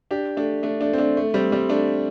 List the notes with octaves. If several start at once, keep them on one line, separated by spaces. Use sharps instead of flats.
D4 G4
A3 D4
A3 D4
A3 D4
C4
A3 D4
A3
G3 C4
G3 C4
A3 D4